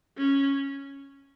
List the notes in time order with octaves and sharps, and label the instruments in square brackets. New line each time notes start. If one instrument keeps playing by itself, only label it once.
[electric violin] C#4